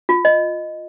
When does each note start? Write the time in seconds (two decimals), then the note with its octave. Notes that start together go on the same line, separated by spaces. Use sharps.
0.09 F4
0.25 D#5